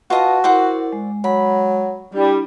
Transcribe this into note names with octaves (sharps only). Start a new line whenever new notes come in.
F4 F#4 B4 D#5 A5 D#6
E4 A#4 C5 D5 F#5
G#3
F#3 B5
G3 D4 E4